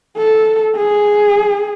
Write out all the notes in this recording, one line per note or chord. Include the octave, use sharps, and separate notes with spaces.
A4
G#4